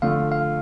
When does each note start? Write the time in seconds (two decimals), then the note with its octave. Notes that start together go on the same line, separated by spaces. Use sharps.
0.02 D3 F3 A3 F5
0.32 F5